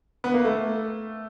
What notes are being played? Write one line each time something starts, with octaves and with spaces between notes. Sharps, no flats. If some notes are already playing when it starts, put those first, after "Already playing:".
B3
A#3
A3